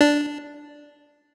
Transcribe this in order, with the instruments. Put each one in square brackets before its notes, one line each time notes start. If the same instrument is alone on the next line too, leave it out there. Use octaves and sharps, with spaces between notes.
[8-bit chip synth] D4